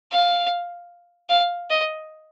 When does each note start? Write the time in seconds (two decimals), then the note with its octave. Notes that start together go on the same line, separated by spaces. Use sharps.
0.12 F5
1.29 F5
1.70 D#5